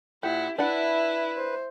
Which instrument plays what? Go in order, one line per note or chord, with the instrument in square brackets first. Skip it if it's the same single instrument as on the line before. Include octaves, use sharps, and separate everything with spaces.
[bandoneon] A#2 F#5 [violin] E4 [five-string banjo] G4
[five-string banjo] D4 F#5 [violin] E4 [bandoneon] B4 [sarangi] E5
[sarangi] C5